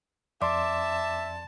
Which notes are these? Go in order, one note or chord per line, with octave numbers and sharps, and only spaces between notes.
F2 D5 E5 A5 C6 D6